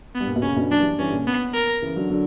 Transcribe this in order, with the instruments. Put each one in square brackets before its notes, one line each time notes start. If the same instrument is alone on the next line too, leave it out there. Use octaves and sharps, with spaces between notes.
[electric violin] B3
[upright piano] G2
A#2
B2
[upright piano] A#2 C#3 [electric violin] C#4
[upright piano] B2 D3
[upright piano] D3 F#3 [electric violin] D4
[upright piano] E3 G3
[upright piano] E3 G3 [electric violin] C#4
[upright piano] D3
A#2 C#3
[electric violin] B3
A#4
[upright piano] C#3 E3
D3 F#3
D3 F#3